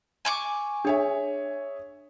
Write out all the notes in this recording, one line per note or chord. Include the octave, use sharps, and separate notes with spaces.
G#5 C#6 D6
D4 G#4 C#5 E5